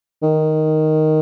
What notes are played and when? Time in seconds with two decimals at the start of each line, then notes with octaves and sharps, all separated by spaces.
0.22 D#3